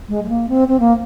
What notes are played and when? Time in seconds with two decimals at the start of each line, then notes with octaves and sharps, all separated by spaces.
0.09 G#3
0.23 G#3
0.28 A#3
0.48 C4
0.67 C4
0.79 A#3